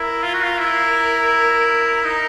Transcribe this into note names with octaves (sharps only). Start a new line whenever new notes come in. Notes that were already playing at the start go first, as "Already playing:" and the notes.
Already playing: E4 A#4
F4
F#4
F4
E4
D#4